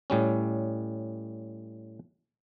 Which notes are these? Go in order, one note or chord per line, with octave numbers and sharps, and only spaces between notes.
A2 G3 C#4